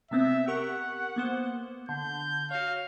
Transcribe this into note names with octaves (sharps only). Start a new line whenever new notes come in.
C3 B3 C4 E5
G4 A#4 F#5 C#6
A#3 B3 C5
D3 G6
F#4 C#5 F5